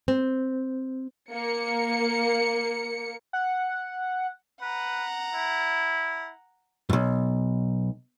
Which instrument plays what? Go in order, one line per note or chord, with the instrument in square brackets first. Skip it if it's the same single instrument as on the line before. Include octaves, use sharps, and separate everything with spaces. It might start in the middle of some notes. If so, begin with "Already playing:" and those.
[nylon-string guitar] C4
[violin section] A#3 C#7
[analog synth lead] F#5
[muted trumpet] B4 [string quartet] F#5 A#5
[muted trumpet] E4
[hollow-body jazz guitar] B1 F#2